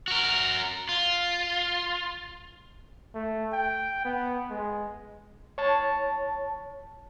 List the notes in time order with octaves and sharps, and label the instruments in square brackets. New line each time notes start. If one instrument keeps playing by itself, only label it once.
[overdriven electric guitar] F#4 A#4
F4
[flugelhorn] A3
G5
B3
G#3
[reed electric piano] C#5 A5